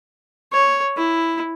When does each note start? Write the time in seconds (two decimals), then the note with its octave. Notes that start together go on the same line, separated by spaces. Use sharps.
0.52 C#5
0.97 E4